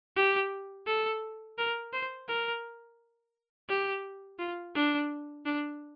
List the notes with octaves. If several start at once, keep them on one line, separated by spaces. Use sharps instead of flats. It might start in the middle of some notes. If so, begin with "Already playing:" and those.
G4
A4
A#4
C5
A#4
G4
F4
D4
D4